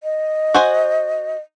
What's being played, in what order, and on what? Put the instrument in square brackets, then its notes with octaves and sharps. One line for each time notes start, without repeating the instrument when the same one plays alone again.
[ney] D#5
[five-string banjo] F#4 C5 G#5